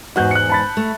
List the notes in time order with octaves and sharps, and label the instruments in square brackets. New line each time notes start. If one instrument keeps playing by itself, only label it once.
[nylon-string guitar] E2 G#2 [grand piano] F#4 F#6 G6
[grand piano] F#6 C#7
A5 B5 A6
[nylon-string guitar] A3